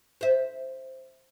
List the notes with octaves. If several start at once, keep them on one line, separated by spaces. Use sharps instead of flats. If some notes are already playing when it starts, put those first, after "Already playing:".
C5 E5